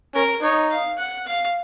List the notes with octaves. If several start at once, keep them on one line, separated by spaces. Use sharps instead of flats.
C#4 A#4
D#4 C#5
F5
F#5
F5